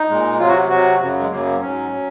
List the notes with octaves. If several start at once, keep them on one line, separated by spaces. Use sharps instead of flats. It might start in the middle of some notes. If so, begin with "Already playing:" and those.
Already playing: D#4
A#2 G#3
C3 F#3 F4
F#4
C3 F#3 F#4
F#2 C#3 F#3 F#4
G#3
F#2 C#3 F#3 A#3
A#3
C4
G#2 F#3 C#4
F#3